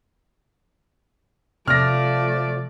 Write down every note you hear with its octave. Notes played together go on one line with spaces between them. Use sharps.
C3 F3 A3 D5 F6 A#6